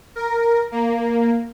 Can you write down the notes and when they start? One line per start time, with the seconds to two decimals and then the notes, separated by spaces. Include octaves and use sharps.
0.16 A#4
0.72 A#3